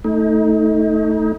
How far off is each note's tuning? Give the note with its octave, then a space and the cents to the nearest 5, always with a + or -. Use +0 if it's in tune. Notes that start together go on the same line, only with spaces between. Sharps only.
A3 +0 D#4 +30